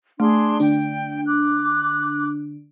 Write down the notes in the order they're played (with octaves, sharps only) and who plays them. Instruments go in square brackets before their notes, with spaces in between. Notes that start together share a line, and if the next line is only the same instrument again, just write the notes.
[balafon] A3 [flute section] D4 G#4 C6
[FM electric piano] D3 D4 [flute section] G5
[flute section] D6 F#6